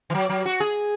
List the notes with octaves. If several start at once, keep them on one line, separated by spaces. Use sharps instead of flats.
E3
F#3
F#3
F#4
G#4